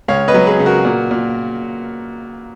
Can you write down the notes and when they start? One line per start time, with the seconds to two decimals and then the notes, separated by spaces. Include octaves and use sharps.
0.08 C#2 C#5 F5
0.28 B4 D#5
0.34 F#3
0.47 G#4 B4
0.59 C#3
0.66 F#4 A#4
0.85 A#2
1.11 A#2